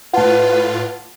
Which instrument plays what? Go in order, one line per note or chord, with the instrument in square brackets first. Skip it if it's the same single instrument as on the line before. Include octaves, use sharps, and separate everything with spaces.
[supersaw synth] A2 F4 [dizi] B4 [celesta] F#5 A5